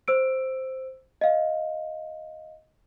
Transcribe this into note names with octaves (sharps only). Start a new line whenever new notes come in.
C5 E6 D7
D#5 F5